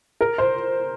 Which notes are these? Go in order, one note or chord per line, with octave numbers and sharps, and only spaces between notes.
A#4
C5